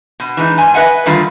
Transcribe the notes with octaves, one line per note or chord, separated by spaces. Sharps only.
B2
E3 G#3 D#4
G#2 G#5
B4 D#5 E5 F#5 G#5
D3 D#3 G3 A3 F4